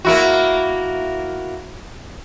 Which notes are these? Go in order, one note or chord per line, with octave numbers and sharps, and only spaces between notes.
A#3 E4 F#4